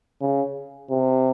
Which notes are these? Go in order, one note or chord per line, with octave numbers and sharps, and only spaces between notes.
C#3
C3